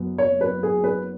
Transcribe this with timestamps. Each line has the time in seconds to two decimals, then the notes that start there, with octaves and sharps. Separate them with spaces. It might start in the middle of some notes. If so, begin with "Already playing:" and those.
Already playing: F#1 F#2 F#3 B3
0.18 C#5
0.41 B4
0.63 G#4
0.84 B4